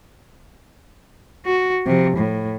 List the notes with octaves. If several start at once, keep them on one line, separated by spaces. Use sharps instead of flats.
F#4
C3 F3
A2